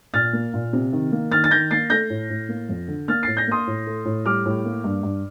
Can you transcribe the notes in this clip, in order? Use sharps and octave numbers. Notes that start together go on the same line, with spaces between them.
A#2 F6 A6
A#3
A#2
C3
D#3
A#3
D#3 F6 A6
A6
D#3 G6 A#6
A#3 A6 C7
A3 G6 A#6
A2
A2
A#3
F2
D3
A#3 F6 A6
A2 A6 C7
G6 A#6
A#3 C6 D#6
A2
A3
A2
G3 D6 F6
A2
A#3
G2
G2